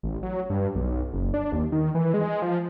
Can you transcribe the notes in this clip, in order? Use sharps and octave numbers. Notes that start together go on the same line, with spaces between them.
A1
F#3
G2
B1
F#1
D4
D#2
D#3
E3
G#3
F3